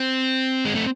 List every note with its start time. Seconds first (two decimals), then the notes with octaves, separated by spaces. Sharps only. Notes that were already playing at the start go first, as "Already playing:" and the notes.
Already playing: C4
0.65 G#3
0.75 A3